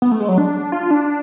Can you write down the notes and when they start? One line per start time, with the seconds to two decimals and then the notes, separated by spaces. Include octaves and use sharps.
0.02 B3
0.11 A3
0.20 G#3
0.29 F#3
0.38 D4
0.72 F4
0.91 D4